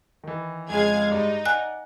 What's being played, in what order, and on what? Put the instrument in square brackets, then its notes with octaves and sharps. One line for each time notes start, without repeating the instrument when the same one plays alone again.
[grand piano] D#3 E3
[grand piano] F2 C#3 [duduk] G#3 [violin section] G#4 F5 G#6
[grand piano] G2 D5 [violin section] D#4
[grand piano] D5 F#5 [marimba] G#5 F#6